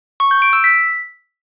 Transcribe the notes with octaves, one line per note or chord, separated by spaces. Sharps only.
C#6
G6
D7
E6
B6